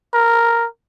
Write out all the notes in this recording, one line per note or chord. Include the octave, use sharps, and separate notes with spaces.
A#4